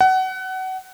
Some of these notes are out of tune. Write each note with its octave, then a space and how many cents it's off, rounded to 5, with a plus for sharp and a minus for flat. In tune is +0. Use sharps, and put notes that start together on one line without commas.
F#5 +25